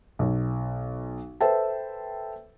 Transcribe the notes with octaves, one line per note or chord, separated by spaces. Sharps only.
B1
A4 B4 C5 E5 G5 A5